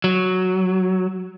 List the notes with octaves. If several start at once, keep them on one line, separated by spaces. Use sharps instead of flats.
F#3